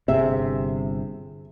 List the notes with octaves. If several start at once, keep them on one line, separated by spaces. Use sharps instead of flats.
G1 C3 G#4 E5